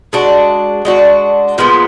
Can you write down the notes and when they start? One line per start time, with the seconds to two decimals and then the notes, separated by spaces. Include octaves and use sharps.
0.13 G#3 D4 F#4
0.85 G#3 D4 F#4
1.58 A#2 F3 G#3 B3